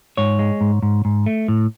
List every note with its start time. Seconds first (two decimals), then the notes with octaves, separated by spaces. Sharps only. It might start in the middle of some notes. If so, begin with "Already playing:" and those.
0.17 G#2 C#5
0.39 G#3
0.61 G#2
0.83 G#2
1.05 G#2
1.26 A3
1.48 A2